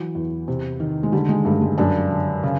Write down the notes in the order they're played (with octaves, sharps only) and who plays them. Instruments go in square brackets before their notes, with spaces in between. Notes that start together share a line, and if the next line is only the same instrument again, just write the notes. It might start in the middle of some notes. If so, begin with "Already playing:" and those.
Already playing: [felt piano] E3 F#3
E2
C3
D#3
G#3
D3 G3
G#3
G2 A3
G#3
F#2 D4
D3
C#3